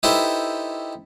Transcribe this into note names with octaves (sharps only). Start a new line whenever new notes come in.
D#4 E4 G4 A4 B4 C5